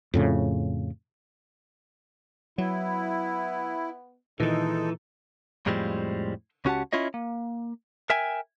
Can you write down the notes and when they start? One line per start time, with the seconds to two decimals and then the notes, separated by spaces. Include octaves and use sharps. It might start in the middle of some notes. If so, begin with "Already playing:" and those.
0.14 F2 A2 C#3
2.58 F#3 B3 E4
4.40 A#2 D#3 E3 G#3 D#4 A4
5.66 F2 A2 F3 G3 G#3 C4
6.65 C#2 C#4 F#4 G4 F#5 A5
6.93 C#4 E4 F4 C#5 D#5
7.14 A#3
8.10 A#4 E5 G5 G#5